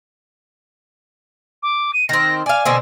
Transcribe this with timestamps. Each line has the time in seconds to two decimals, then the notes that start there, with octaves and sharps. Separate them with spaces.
1.63 D6
1.93 D#7
2.09 D#3 C4 A#6
2.46 D5 F5 G#5
2.65 B2 D3 C4